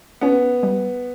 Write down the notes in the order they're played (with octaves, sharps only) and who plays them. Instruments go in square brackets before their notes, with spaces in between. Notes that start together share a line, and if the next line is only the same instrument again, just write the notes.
[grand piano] B3 [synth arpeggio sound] C#4
[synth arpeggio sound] G3